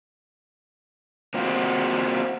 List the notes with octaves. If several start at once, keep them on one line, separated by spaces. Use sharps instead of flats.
A#3 C4 F4 F#4